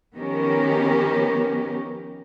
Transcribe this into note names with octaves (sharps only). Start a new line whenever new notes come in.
D#3 F3 B3 C#4 G4 A#4